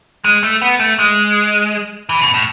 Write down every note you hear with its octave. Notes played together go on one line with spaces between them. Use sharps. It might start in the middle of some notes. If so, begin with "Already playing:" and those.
G#3
A3
B3
A3
G#3
E3
B2
A2